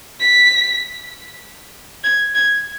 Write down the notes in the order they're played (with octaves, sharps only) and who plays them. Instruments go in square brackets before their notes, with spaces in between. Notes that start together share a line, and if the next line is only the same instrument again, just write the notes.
[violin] B6
G#6
G#6